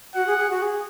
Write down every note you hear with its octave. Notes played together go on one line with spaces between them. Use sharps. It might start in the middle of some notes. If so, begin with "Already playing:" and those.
F#4 F#5
G#4
G#4
F#4
G#4